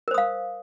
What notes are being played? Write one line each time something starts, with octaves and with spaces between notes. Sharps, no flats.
A#4 C5 F5 D#6